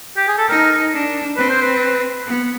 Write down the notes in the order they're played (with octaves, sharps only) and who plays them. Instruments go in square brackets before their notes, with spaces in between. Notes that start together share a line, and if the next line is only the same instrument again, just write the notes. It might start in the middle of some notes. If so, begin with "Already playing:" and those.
[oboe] G4
G#4
A4
[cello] D#4 [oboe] A#4
[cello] D4
[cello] C4 [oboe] B4
[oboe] C5
B4
[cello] B3